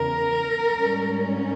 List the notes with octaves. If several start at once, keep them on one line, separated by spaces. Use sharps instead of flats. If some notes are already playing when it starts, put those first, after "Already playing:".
Already playing: E2 C#3 E3 A#4
G#2 G3 C#4